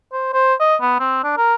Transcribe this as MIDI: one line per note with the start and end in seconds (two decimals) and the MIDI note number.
0.12 0.33 72
0.34 0.54 72
0.60 0.75 75
0.81 0.95 59
1.00 1.21 60
1.24 1.33 62
1.37 1.55 70